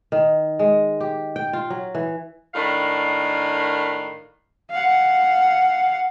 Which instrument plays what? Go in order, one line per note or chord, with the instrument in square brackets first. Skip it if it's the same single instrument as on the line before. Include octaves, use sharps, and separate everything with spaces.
[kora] D#3
G#3
G4
G5
F4
F#3
E3
[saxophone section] A2 D#3 D4 F5
[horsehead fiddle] F5 F#5